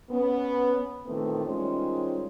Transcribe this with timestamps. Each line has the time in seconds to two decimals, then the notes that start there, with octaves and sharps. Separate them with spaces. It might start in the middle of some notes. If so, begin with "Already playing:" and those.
0.10 B3 C#4
1.06 A#2 D#3 E3 A3 B3 C4
1.44 D#3 G3 G#3 C#4 F4 C5